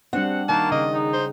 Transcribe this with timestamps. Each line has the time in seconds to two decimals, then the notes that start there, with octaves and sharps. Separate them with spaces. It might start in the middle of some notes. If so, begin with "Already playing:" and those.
0.13 G3 C4 D4 F#5
0.49 D#3 A#3 A5
0.72 C#3 D#5
0.93 D#4
1.13 C5